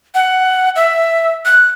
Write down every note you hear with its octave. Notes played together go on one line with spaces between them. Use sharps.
F#5
E5
F#6